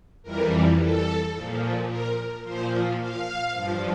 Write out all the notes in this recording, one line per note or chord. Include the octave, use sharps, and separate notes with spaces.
F2 E3 G3 A#4
A4
A#2 F3
A#4
A#2 F3 C5
F5
G2 F3